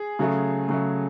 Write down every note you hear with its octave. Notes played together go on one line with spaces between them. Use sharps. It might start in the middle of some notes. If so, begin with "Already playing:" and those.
Already playing: G#4
C#3 F#3 A3
C#3 F#3 A3